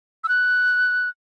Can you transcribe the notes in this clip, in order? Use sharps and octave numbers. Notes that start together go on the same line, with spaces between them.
E6
F#6